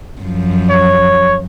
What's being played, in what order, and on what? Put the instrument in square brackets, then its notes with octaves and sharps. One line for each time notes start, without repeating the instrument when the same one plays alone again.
[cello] F#2 F3
[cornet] C#5